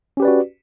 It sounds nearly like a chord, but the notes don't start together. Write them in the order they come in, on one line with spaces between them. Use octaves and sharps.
C#4 G4 B4 D5 F#4